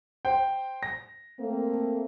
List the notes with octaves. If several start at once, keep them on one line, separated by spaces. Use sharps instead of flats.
C5 G5
A#6
A3 A#3 C4